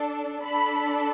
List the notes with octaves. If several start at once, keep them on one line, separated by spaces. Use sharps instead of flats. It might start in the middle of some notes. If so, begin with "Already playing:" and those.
Already playing: D4 A4
D4 A4 B5